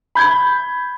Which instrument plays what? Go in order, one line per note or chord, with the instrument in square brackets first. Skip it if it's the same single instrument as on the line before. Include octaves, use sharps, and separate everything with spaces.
[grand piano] B5 G6 G#6